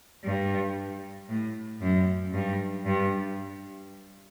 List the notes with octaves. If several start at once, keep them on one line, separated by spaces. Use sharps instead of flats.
G2
A2
F#2
G2
G2